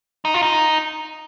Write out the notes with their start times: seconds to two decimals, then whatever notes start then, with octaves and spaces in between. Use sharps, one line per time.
0.25 D#4
0.34 F4
0.43 D#4